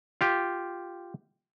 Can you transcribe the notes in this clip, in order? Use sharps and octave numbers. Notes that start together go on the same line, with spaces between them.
F4 G4